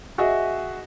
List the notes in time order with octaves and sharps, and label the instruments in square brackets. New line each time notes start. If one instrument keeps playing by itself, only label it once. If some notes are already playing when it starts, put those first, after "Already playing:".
[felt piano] F#4 G#4 D#5 E5